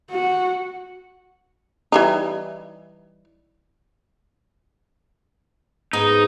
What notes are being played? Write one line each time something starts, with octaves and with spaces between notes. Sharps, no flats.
F#4
E3 G3 D#4
G#2 B3 D#4